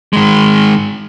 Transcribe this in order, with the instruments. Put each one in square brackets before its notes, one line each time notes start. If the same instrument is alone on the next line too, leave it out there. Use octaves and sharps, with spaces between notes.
[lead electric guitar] D#3 G#3